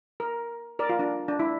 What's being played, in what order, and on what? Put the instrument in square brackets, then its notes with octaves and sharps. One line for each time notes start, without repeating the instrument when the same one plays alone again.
[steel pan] A#4
A#4 D5
F4
D4
D4
E4